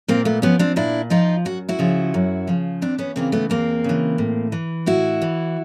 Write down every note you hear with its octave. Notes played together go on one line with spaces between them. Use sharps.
A#2 A#3 C4
A3 B3
F3 B3 C#4
C4 D4
A#2 D4 E4
F3 D#4 F4
F#2 F#4
E4 F#4
C#3 F3
F#2
C#3 F3
E2 C4 D4
B3 C#4
C#3 E3 A#3 C4
A3 B3
E2 A#3 C4
C#3 E3
A2
E3
A2 E4 F#4
E3